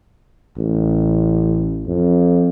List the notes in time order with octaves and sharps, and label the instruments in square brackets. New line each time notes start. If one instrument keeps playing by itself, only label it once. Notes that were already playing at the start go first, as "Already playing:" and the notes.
[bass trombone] A1
F2